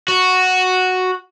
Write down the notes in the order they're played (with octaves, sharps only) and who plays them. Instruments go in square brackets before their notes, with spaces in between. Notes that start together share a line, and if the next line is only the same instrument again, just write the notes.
[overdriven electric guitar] F#4